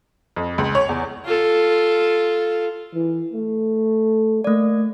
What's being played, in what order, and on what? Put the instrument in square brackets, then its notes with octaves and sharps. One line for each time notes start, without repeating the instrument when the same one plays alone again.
[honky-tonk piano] F2
C#2
C#5
E2
[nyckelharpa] F4 A4
[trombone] E3
A3
[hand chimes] A3 D5 [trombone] A#3